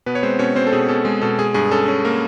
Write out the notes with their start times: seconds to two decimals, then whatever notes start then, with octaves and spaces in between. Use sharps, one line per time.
0.06 B2 B3 B4
0.15 C#5
0.23 G#3 C4 C5
0.39 B2 C#4 C#5
0.55 B2 C4 C5
0.67 A4
0.73 B2 G#4
0.89 B2 A4
1.05 G#3 G#4
1.22 B2 A4
1.39 G#3 G#4
1.54 G2 G#4
1.71 C#4 A4
1.88 C#4
2.05 A#3 A#4